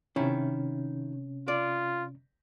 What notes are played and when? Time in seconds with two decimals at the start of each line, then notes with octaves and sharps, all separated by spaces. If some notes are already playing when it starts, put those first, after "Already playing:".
0.16 C3 D#3 C#4 E4
1.48 F4 D5